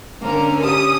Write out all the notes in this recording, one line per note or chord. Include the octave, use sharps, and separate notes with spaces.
D3 A#3 C#4 D4 A#4
G4 A5 D#6